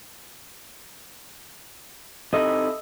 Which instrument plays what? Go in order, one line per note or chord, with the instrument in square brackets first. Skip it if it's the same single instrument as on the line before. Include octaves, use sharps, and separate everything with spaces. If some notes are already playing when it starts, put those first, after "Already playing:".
[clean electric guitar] C3 D#4 E4 [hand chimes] A4 E5 E6 [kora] D#5